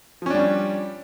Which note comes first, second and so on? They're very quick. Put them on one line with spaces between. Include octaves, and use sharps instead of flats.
F3 C#4 D4 G3